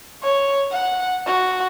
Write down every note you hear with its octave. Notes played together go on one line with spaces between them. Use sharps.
C#5
F#5
F#4